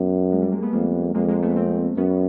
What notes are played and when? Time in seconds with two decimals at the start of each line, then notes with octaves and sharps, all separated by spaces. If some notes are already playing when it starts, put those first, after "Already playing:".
Already playing: F#2 B3
0.32 G#3 A#3
0.42 G3 A3
0.52 G#3 A#3
0.63 A3 B3
0.73 F2 G#3 A#3
1.15 F2 G#3 A#3
1.28 G#3 A#3
1.43 A3 B3
1.56 A#3 C4
1.97 F#2 B3 C#4